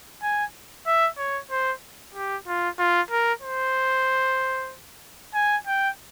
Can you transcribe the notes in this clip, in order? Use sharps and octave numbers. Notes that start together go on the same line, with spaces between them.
G#5
E5
C#5
C5
G4
F4
F4
A#4
C5
G#5
G5